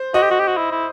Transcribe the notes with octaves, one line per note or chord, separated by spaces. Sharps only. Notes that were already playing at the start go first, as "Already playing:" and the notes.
Already playing: C5
F#4 D#5
G4
F#4
G4
F#4
E4
E4